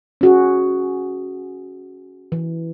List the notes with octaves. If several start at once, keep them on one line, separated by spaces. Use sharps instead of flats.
C#4 F#4 G#4
E3